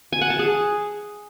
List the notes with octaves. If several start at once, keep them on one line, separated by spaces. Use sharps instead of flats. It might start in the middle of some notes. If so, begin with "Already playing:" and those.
G#5
F#5
A5
G#4